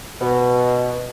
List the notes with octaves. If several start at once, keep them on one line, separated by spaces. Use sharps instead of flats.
B2